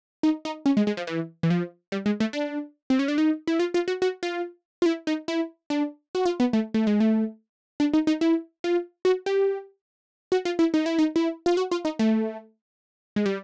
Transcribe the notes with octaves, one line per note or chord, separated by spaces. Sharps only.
D#4
D#4
C#4
G#3
G#3
F3
E3
E3
F3
G3
G#3
A3
D4
C4
C#4
D4
D#4
E4
F4
F4
F#4
F#4
F4
F4
E4
D#4
E4
D4
F#4
F4
B3
A3
A3
G#3
A3
D4
D#4
D#4
E4
F4
F#4
G4
F#4
F4
E4
D#4
E4
D#4
E4
F4
F#4
F4
D#4
A3
G#3
G3